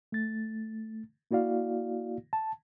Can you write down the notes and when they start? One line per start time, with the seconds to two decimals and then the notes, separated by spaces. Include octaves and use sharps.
0.12 A3 A6
1.31 A#3 E4 F#4 D5 F5
2.33 A5